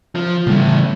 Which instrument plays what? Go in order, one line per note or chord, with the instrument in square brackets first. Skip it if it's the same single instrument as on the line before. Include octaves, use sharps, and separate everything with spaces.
[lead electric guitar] F3
[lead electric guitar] A2 E3 [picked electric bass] C#3 G3 B3